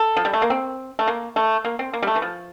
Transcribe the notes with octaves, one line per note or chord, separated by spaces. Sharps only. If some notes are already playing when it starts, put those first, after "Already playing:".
Already playing: A4
F3
G3
A3
A#3
C4
A3
A#3
A3
A#3
C4
A#3
G3
A3
E3
F3